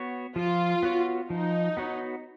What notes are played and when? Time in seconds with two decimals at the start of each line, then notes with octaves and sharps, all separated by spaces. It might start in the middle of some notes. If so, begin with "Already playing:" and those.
Already playing: B3 F#4 C#5
0.36 F3 F4
0.83 B3 F#4 C#5
1.30 F3 D#4
1.77 B3 F#4 C#5